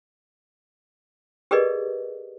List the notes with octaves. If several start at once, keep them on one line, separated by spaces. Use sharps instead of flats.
G4 G#4 A#4 B4 D5 D#5